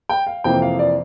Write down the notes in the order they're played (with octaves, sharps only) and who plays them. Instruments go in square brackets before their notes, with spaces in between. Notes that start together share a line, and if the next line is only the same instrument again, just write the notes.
[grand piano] G5
F5
F2 C3 E3 A#3 G5
F5
D5